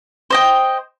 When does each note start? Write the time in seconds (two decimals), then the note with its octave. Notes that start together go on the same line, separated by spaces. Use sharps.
0.30 C5 D#5 G5